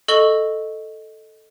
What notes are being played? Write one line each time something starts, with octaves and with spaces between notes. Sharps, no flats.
A4 D#5 C#6 F#7 G7